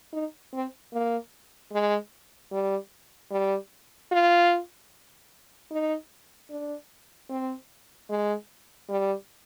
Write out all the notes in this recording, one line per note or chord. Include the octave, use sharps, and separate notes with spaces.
D#4
C4
A#3
G#3
G3
G3
F4
D#4
D4
C4
G#3
G3